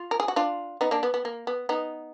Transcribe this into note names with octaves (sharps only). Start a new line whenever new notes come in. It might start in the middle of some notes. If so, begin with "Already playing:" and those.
Already playing: F4
A#4
G#4
F#4
D4 F4
B3 D#4
A#3 D4
B3
B3
A#3
B3
B3 D#4